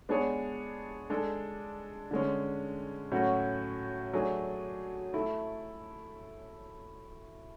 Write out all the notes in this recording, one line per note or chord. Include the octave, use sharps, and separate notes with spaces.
G#3 B3 D4 G#4 C#5
G#3 D4 A4
D3 G#3 C#4
A2 F#3 C#4 F#4
F#3 A3 D4 G#4
A3 E4 A4